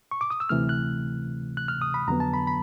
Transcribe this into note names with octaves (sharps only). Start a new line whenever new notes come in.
C#6
D6
D#6
E6
D2 C3 E3 A3 F6
F#6
F#6
F6
D#6
B5
F2 D3 F#3 B3 A#5
A5
B5
B5